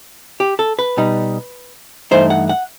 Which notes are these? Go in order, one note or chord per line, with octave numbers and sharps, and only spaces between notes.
G4
A4
B4
B2 G3 D#4
G2 E3 A3 D#4 C5
F#5
F#5